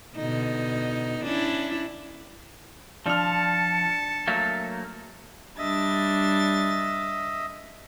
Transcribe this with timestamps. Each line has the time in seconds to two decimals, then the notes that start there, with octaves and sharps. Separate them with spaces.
0.16 B2 D3 D#4
1.23 C#4 D4 E4
3.06 F3 D4 A5 F6 C#7
4.28 F#3 A3 A#3
5.59 G3 D4 D#5 E5 A6